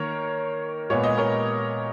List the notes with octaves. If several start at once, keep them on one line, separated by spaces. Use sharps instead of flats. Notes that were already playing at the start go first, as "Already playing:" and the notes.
Already playing: D#3 A#3 A#4 C#5
A#2 G#3 B3 C#5
D#5
A#4 C#5